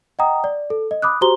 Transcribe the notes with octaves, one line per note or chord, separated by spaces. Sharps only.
D#5 F#5 G5 A#5 D#6
D5
A4
D#5
B5 D6 D#6 F#6
F#4 G4 C5 A#5 C6 G7